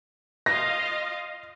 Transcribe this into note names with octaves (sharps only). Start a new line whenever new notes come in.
F4 D#5 F5 A#6